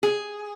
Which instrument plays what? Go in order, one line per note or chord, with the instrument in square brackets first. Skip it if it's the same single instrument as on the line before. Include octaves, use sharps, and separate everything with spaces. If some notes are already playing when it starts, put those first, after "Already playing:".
[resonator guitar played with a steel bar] G#4